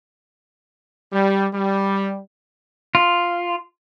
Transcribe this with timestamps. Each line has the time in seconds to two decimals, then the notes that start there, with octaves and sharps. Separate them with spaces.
1.12 G3
1.52 G3
2.95 F4